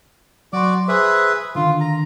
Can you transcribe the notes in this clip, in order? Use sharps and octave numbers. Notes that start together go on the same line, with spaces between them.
F#3 F#4 D5 C6 D6
G#4 B4 C5 E5 B5 C6
D3 D#3 D4 F4
A#5